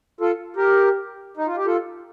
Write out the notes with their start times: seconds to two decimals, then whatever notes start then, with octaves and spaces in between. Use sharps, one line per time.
0.20 F4 A4
0.56 G4 A#4
1.37 D#4
1.46 F4
1.56 G4
1.66 F4 A4